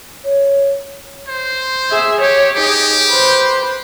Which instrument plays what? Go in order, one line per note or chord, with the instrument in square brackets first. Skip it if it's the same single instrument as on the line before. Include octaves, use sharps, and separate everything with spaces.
[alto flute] C#5
[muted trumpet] C5
[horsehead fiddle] G#4 E5
[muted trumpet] G4 [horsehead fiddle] C#5
[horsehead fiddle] D#4 G#4 [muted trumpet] G4
[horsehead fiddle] B4 C5